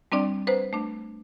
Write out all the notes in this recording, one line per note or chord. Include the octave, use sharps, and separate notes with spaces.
G3 C4 D4 D5
B4 C5
A3 D4